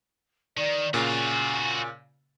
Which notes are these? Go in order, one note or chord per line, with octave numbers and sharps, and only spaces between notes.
D#3 D5
A#2 C#3 F4 F#4 G#5